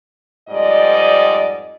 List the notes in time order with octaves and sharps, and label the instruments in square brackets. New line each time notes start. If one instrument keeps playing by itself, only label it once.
[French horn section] F2 G#2 G3 D5 D#5